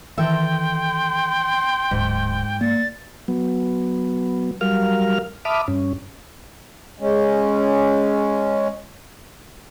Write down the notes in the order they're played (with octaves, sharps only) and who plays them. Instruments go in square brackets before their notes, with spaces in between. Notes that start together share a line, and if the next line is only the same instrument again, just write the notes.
[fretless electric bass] D#3 E3 [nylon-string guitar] A4 E5 [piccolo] G5 [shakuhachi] C6
[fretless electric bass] D1 [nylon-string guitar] G#2
[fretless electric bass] A#3 [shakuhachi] D5 [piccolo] A6
[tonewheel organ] F#3 B3
F#3 G3 A#4 F5 F6
E5 A5 B5 D6 D#6 F6
G2 C#4
[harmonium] G#3 C#4